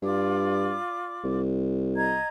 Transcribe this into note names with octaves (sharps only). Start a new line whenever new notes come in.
G2 F4 D5 D6
C2
D#5 A#5 G#6